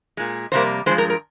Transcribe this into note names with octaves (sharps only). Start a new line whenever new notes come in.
A#2 G#3
F2 C3 G3 A#3 C5
G2 F3 G#3 C5
A#4
A#4